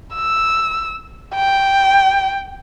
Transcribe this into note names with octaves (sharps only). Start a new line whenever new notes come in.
E6
G5